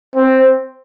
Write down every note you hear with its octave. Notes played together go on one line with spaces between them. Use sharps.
C4